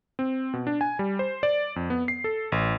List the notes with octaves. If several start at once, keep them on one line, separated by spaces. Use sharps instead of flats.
C4
B2
D4
G#5
G3
C5
D5
F2
B3
C7
A4
A1